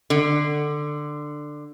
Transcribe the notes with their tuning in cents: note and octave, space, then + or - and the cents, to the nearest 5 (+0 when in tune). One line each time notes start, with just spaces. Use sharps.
D3 +15